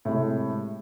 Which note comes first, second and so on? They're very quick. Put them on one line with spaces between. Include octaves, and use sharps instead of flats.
A2 C3 G#3